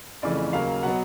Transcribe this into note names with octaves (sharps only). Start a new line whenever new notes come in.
F2 C#3 E3 A3 D5
D#2 C#3 F#3 A#3 F5
B2 F#3 B3 F#5